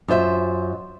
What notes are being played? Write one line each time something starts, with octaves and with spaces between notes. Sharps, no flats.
F#2 F4 C5 E5